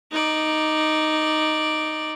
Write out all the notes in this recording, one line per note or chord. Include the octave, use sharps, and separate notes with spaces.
D#4 D5